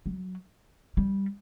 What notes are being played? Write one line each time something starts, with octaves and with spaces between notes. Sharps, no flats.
F#3
G3